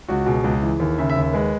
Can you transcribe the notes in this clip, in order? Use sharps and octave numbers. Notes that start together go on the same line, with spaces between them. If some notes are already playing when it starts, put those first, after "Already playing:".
C#2 F#4
B2 G#4
C#2
E3
D#2
C#3 E5
E5
D#2
E5
G#3 B4